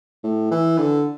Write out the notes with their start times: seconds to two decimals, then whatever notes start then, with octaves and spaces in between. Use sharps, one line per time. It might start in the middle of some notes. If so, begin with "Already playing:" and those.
0.24 A2
0.51 E3
0.78 D3